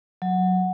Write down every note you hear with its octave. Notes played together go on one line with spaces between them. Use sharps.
F#3